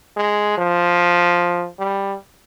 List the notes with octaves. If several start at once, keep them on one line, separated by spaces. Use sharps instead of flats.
G#3
F3
G3